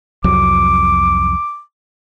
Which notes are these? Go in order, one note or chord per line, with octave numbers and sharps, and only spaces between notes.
C2 F2 F#3 D6